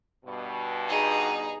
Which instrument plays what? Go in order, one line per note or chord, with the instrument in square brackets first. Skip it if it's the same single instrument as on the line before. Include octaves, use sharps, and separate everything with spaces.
[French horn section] G2 B2
[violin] D#4 G#4